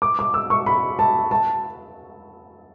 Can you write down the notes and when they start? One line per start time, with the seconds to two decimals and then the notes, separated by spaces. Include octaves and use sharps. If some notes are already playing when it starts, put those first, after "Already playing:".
0.02 D6
0.19 D6
0.34 E6
0.50 C#6
0.66 B5
0.99 A5
1.31 A5